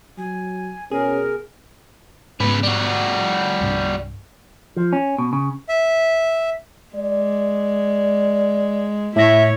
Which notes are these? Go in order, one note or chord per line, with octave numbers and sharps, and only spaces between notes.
F#3 G#5
B2 C#4 G#4 A#4
G#2 C#3 B3 B4
G3 F#4
C2 G2
F3
C#4
B2
C#3
E5
G#3 D5
A2 E4 C#5 E5 A#6